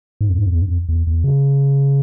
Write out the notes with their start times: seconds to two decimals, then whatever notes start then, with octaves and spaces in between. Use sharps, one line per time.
0.21 G#2
0.30 F2
0.38 G#2
0.46 F2
0.55 E2
0.62 G2
0.66 F2
0.89 E2
1.07 E2
1.24 C#3